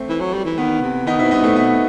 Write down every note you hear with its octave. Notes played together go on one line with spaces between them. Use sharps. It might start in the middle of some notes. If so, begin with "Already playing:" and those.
Already playing: A3 C4
E3
F#3
G3
E3
D#3 B3
C3
D#3 B3 D#4
B2 C4 E4
G2 B3 D#4
A2 A3 C4
B2 B3